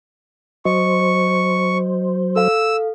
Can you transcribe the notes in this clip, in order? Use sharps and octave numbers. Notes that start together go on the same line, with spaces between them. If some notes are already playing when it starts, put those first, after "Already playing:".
F#3 C5 D#5 C#6
A4 F5 E6